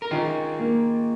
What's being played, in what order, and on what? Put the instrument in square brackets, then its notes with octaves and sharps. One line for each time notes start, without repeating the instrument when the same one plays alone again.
[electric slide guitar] A#4
[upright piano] D#3 [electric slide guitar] F4 G#4
[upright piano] A#3